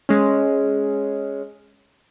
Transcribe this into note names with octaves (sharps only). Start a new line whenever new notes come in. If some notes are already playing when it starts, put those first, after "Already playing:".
G#3 C#4